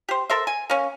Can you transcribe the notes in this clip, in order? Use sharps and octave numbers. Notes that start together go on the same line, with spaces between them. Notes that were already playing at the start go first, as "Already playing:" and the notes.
G4 C5
A4 A#4 C5 E5
G#5
A#3 C#4